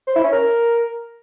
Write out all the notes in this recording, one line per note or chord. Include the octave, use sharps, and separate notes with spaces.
C5
E4
C#4
A#4